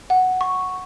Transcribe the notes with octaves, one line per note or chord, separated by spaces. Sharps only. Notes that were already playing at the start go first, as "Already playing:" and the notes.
F#5
C#6